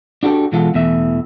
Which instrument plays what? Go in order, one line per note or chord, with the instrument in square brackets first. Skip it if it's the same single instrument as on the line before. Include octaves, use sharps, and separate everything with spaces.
[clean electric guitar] D4 F#4 G4 A4 D5
B2 E3 G#3 F4 A4 F#5
E2 B2 E3 A3 E5